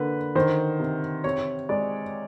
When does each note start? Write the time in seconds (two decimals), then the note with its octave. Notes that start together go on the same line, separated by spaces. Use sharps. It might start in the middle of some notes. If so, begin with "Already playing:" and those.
Already playing: D3 A#3 B4
0.35 D#3 C5
0.80 C3
1.24 C3 C#5
1.69 G#3 D5